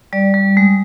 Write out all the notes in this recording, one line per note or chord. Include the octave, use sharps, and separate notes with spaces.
G3 D5
G3
G#3